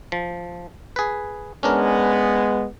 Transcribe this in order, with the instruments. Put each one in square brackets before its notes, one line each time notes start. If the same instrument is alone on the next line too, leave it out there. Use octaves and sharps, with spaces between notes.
[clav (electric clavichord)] F3
G#4 B4
[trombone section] G#3 B3 [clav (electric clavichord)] C#4 D4 A#4